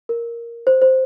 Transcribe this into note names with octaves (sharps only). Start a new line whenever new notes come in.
A#4
C5
C5